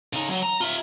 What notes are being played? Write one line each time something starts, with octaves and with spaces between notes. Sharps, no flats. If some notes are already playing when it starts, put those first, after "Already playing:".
C#3 D#4
F#3
A#5
F4 E5